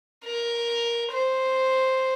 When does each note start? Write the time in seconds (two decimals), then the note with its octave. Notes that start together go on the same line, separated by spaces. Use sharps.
0.25 A#4
1.12 C5